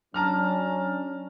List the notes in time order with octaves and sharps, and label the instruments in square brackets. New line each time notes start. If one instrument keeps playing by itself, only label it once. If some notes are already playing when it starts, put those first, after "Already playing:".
[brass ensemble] F#3 C#4 D4 [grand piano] A5 A#5 F6